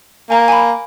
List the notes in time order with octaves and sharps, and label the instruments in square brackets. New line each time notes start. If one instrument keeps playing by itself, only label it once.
[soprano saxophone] A#3 [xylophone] G#5 A#5
[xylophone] G#5 B5